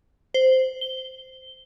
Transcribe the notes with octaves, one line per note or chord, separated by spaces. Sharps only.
C5
G7